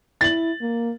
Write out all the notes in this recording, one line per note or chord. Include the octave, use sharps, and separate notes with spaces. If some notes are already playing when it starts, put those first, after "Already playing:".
E4 A6 F#7
A#3